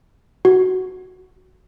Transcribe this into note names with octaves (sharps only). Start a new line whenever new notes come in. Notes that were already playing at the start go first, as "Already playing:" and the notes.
F#4